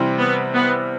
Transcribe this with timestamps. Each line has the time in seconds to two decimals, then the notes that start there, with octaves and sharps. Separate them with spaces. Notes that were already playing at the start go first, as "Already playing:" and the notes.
Already playing: C3 E3 G3 C4
0.18 B3
0.54 B3